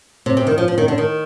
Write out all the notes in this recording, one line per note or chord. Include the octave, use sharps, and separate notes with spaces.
C3
C3
D#3
F3
F3
D#3
D3
D#3